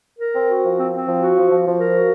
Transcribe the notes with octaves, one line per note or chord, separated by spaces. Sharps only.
A#4
C4
F#4
F3
C4
C4
F3
F#4
F3
F3
F3
A#4
F#4